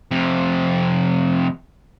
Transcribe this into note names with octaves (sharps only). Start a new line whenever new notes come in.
F2 C3